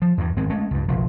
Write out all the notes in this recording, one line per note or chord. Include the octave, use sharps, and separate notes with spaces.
F3
E2 G2
G#1 G#3 C4
G#3 A3 C#4
C#2 G2
F#1 B1 F3